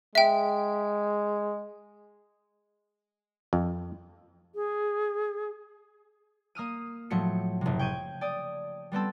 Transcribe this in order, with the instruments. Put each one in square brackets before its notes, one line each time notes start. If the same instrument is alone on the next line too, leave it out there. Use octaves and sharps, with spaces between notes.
[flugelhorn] G#3 [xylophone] E5 G5
[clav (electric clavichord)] F2
[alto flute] G#4
[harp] A#3 D#6 F6 D#7
A2 F3 F#3 A3 C#7
F#1 C3
G5 C#6 G6 G#6 D#7
D5 G5 D#6
G3 B3 C4 A4